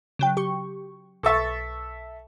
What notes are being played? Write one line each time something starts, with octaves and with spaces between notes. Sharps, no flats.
C#3 F#3 G5
G4 C#6
B1 A4 E5 C#6 A6